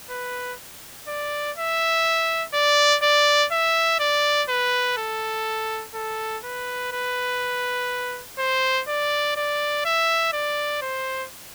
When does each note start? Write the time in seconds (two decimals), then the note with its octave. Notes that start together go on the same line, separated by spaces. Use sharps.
0.10 B4
1.08 D5
1.57 E5
2.54 D5
3.03 D5
3.52 E5
4.00 D5
4.49 B4
4.97 A4
5.95 A4
6.44 B4
6.92 B4
8.39 C5
8.88 D5
9.36 D5
9.85 E5
10.33 D5
10.82 C5